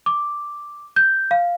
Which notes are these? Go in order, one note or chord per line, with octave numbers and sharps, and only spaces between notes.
D6
G6
F5